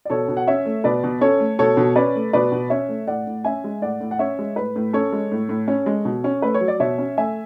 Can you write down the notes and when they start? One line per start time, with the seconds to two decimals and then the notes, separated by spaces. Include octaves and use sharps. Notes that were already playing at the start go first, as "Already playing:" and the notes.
0.05 D5
0.10 B2 A4 C#5
0.28 B2
0.37 F#5
0.47 C#4 C#5 E5
0.66 A3
0.84 B2 B4 D5
1.04 B2
1.21 C#4 A4 C#5
1.40 A3
1.59 B2 A4 C#5
1.77 B2
1.96 C#4 B4 D5
2.15 A3
2.33 B2 B4 D5
2.52 B2
2.70 C#4 C#5 E5
2.89 A3
3.07 A2 D5 F#5
3.27 A2
3.44 C#4 E5 G#5
3.64 G#3
3.82 A2 D5 F#5
4.01 A2
4.11 F#5
4.19 C#4 C#5 E5
4.39 G#3
4.56 A2 B4
4.76 A2
4.93 C#4 A4 C#5
5.13 G#3
5.32 A2
5.49 A2
5.68 C#4
5.86 G#3
6.05 B2
6.24 C#4
6.42 A3 B4
6.54 C#5
6.61 F#3
6.68 D5
6.80 B2 C#5 E5
6.98 C#4
7.18 A3 E5 G#5